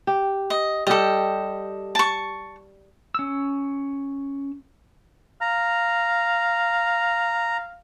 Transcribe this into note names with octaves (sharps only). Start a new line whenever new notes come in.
G4
D#5
G3 G4 A4 D#5
A5 C#6
C#4 E6
F5 A#5